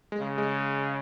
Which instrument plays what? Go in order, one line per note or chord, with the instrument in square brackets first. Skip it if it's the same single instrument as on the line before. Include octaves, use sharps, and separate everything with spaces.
[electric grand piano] G#3
[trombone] C#3
[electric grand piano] G#3